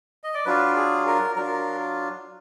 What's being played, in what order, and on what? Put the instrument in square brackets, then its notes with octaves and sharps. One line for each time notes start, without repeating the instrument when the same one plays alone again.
[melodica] D#5
D5
F#3 D4 F4 B4
G#4
A#4
F#3 D4 F4 A#4